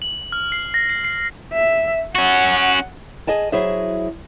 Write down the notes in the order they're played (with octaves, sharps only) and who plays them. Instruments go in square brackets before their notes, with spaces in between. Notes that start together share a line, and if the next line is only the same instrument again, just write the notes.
[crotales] F#7
F6
C7
A#6
C7
C7
[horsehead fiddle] E5
[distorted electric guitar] C#4 F#4 [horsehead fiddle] F#5
[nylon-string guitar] G#4 D#5 G#5 A5
F#3 E4 G#4 C5 E5